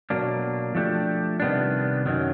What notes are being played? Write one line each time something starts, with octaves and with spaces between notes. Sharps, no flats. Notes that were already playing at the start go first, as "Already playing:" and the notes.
B2 F#3 A#3 D4
F3 A3 D4 G4
C3 D#3 G3 B3 D4
F#2 D#3 F#3